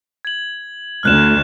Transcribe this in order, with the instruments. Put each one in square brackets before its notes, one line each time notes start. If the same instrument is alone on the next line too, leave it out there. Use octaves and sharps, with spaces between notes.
[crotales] G#6 F#7
[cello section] D2 [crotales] F6 F#6 E7